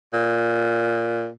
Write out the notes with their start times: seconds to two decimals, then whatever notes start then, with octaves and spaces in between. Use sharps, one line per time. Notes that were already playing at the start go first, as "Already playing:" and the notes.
0.14 A#2